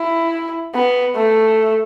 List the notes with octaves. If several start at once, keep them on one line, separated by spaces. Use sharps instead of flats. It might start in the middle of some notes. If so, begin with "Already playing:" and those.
Already playing: E4
B3
A3